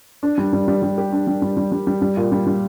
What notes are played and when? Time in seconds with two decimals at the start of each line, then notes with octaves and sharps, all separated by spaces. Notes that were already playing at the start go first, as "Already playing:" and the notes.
0.23 D4
0.38 G3
0.53 G3
0.68 G3
0.83 G3
0.98 G4
1.12 D4
1.27 G3
1.42 G3
1.57 G3
1.72 G3
1.87 G3
2.02 G3
2.17 A#2
2.32 G3
2.47 G3